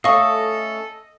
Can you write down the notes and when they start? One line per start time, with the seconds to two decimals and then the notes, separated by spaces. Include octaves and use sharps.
0.04 A3 C#4 A4 D#5 F5 C#6